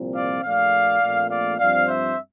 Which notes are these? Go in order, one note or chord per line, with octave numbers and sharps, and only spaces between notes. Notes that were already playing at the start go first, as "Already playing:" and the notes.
Already playing: C2 A#2 F3 C4
D5 F5
A#1 A#2 A3 D5 F5
A#1 A#2 A3 C4
D5 F5
G2 F3 C4 D5 F5
C5 E5